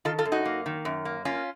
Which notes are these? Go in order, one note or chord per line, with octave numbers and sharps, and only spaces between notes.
D#3 F4 A4
F4 A4
F#2
D#4 F#4
A#3
D#3
F#2
A#3
A#3 C#4 F4